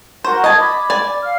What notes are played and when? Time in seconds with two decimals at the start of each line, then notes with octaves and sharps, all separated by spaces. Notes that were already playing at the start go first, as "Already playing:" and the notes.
0.24 F#4 A#4 C5 C#6
0.44 D#5 A5 G#6
0.59 B5 D6
0.90 D5 G#5
1.22 F5 F6